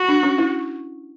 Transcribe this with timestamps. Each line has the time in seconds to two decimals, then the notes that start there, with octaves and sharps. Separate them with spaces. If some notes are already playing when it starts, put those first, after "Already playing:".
Already playing: F#4
0.08 D4
0.23 C#4
0.38 E4